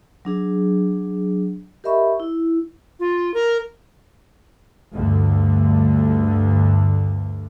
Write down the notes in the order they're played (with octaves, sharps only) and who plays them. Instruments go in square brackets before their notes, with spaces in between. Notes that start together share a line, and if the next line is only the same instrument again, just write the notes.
[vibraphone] F#3 D4 G#4
G4 A#4 D#5 E5 B5 C#6
E4
[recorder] F4
A#4
[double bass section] D2 G2 D3